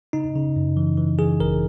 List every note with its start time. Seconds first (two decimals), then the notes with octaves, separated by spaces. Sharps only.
0.13 C#3 D#4
0.35 C#3
0.56 F#2
0.77 E3
0.98 E3
1.19 E3 G#4
1.40 G#1 A#4